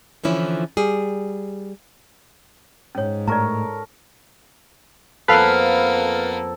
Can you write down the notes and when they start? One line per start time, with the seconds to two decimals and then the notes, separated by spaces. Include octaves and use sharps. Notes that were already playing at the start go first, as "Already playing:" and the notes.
0.24 D3 E3 F3 C#4 E4
0.77 G3 G#4
2.95 G#2 C#4 C#5
3.27 A2 A4 A#4 C#5 D5 A#5
5.28 F2 A#3 B3 A4 B4 F5